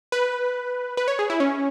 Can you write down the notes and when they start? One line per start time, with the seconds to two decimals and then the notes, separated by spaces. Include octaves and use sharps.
0.12 B4
0.97 B4
1.08 C#5
1.19 G#4
1.30 E4
1.40 C#4